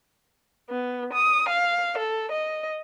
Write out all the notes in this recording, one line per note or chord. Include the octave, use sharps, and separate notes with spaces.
B3
D#6
F5
A4
D#5